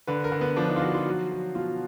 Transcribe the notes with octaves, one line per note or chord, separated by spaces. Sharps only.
D3 B4
A#4
D3
B3
F3 D4
D#4
F4
F3 F#4
F4
F#3 F#4
F#3
B2 F4